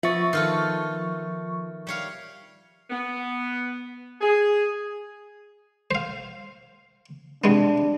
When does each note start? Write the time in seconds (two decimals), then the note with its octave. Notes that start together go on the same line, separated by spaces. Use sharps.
0.03 F3 B3 E5 C#6 A6
0.33 D#3 F4 A4
1.87 G3 C#5 F5
2.90 B3
4.21 G#4
5.91 C5 F5
7.44 C3 G#3 B3 D4